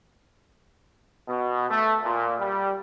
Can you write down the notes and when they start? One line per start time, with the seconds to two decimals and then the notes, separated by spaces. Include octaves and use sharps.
1.28 B2
1.70 A3
2.03 A#2
2.40 G3